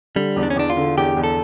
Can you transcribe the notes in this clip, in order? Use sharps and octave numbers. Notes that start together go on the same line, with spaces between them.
D3 G3
E2
D4
C#4
E2 D4
F4
D3
E2 G4
E2
A4